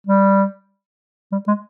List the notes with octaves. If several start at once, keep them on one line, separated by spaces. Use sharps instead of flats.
G3
G3
G#3